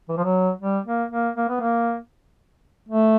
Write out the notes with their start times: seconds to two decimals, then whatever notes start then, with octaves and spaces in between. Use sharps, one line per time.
0.09 E3
0.17 F3
0.24 F#3
0.62 G3
0.86 A#3
1.11 A#3
1.37 A#3
1.49 B3
1.60 A#3
2.88 A3